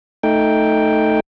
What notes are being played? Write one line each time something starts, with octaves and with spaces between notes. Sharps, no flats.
A3 D#4 G5